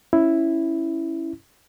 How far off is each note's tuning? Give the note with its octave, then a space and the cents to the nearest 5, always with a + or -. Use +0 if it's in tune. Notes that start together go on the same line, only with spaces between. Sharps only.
C#4 +0 E4 +0